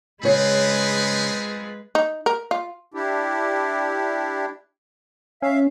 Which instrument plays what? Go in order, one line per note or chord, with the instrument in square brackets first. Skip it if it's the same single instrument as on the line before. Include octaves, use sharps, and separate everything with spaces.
[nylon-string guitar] C#3 C#5 [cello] G#3 B4 [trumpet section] C4 F4 G#4
[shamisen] D#4
A#4
F4
[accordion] D4 E4 G4
[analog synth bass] C#4 [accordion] E5 F5